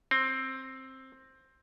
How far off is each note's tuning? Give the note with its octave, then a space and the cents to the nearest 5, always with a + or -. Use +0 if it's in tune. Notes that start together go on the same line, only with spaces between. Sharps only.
C4 +10